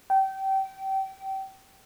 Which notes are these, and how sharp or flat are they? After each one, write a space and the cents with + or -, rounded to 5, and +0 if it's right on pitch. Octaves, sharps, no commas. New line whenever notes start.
G5 -25